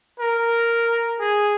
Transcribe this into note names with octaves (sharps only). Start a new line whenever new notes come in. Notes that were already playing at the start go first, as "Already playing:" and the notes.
A#4
G#4